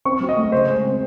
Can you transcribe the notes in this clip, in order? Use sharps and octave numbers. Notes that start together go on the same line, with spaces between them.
C4 C#6
F#3
D#5
A3
C#3 C5
G#3
C4